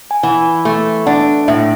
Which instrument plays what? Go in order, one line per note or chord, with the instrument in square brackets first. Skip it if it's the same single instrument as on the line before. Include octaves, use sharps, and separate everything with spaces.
[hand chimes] G#5
[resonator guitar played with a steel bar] E3 [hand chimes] F#5
[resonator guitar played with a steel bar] A3
[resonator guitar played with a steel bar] D4 [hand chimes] F#5
[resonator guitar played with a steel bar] A2 [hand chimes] E5